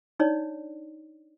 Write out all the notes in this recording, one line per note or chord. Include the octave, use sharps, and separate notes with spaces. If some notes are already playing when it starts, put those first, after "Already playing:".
D4 D#4 C#5 D5